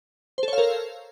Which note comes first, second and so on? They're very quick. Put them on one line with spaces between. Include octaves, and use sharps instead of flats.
C5 A4 C#5 F5 A#4